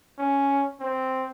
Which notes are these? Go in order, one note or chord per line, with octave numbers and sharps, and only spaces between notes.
C#4
C4